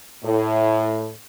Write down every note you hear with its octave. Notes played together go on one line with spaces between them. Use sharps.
A2